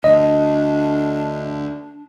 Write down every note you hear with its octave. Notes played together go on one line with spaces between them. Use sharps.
D2 D4 D#5